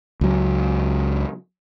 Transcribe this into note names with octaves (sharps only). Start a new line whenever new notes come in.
C#2 F#3